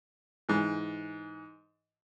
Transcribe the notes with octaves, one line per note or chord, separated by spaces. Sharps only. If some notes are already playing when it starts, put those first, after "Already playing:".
G#2 E3